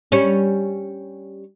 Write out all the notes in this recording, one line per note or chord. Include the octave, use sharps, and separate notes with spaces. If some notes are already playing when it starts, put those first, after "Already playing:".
G3 C#4